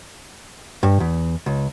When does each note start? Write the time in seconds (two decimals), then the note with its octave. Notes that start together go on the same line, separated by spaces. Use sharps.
0.83 G2
1.00 E2
1.46 C#2